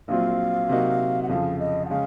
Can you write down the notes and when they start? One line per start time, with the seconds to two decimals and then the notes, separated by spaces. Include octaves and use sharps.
0.08 A#1 A#2 F#3 C4 F4 F5
0.69 C3 F#3 A#3 D#4 F#4
1.23 F#5
1.29 F2 C#3 F3 F5
1.60 D#5
1.85 F#5
1.90 C#3 G#3 C#4 F5